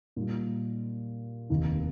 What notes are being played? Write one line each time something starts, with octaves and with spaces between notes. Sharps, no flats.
A#2 G3 A#3 D#4
F1 D#2 D#3 A#3